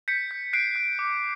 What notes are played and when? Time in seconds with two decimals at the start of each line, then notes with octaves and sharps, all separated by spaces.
0.08 G6 B6 C#7
0.31 G6
0.53 F#6 C7 D7
0.76 F#6
0.99 D6